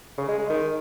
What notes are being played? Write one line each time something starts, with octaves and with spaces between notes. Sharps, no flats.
C#3
G#3
G#3
D#3